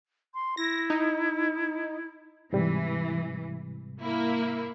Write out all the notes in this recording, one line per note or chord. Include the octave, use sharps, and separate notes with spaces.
C6
E4 A#6
D#4
G#2 C3 E3 G3
A#3 E4